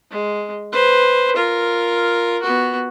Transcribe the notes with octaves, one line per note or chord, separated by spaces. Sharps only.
G#3
B4 C5
F4 A#4
B3 F#4